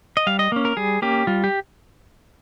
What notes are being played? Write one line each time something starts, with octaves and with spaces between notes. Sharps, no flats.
D#5
G3 F5
D#5
A#3 C#4
A#4
G3 G#4
A#3 C#4 G4
G3 F4
G4